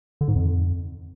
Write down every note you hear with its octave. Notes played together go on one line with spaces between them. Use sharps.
D3
G#2
F2